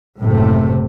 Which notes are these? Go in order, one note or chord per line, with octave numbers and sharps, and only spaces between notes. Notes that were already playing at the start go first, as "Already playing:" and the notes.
F#1 A2 C3 A3